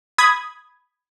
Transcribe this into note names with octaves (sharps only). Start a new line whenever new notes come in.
B5 D#6 G#6